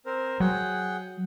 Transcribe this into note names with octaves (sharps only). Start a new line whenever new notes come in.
C4 A#4 C5
F#3 G#4 F#5 G5